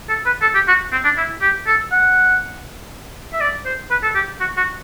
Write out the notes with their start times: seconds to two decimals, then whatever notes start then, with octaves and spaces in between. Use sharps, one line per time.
0.09 A4
0.26 B4
0.42 A4
0.55 G4
0.68 F#4
0.92 C4
1.04 D4
1.17 E4
1.42 G4
1.67 A4
1.92 F#5
3.33 E5
3.41 D5
3.65 C5
3.91 B4
4.03 A4
4.15 G4
4.40 F#4
4.57 F#4